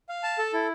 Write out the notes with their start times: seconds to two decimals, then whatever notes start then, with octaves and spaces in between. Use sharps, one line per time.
0.09 F5
0.23 A5
0.39 A4
0.53 E4